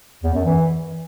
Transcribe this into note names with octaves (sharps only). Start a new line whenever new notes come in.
E2
F#2
E3